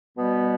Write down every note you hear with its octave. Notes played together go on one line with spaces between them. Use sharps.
B2 G3 B3